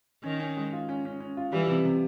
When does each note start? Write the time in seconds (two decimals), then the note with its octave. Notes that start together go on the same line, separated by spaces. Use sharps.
0.24 D#3 C#4
0.40 C#4
0.57 G#3
0.73 F4
0.89 C#4
1.05 C#4
1.20 C#4
1.37 F4
1.52 E3 G3
1.69 C3
1.85 C3